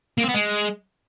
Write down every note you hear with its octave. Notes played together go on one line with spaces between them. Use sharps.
A#3
C4
B3
G#3